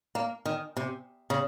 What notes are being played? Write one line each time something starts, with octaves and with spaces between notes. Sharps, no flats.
A#3
D#3
C3
C#3